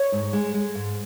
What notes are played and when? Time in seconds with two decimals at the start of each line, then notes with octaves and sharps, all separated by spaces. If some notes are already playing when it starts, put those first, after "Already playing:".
Already playing: C#5
0.12 G#2
0.33 G#3
0.54 G#3
0.75 G#2